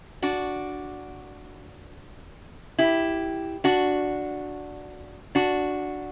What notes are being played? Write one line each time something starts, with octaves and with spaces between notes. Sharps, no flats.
D4 F#4
E4 G4
D4 F#4
D4 F#4